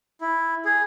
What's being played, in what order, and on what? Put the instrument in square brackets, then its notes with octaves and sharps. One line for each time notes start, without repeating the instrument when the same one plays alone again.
[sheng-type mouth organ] E4
G#4